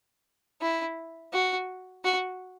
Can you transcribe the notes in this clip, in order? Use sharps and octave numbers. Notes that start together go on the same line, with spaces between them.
E4
F#4
F#4